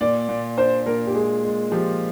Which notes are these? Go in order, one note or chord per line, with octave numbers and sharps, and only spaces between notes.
A#2 D5
A#2
D4 C5
A#2 A#4
G4
G#3 G#4
G#3
F3 G4